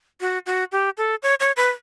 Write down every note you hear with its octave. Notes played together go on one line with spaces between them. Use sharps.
F#4
F#4
G4
A4
C#5
C#5
B4